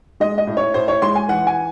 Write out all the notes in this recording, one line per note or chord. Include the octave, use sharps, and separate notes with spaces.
G#3 D#5
D#5
A2
C#5
A2 C5
C#5
G#3 C6
G#5
E3 F#5
G#5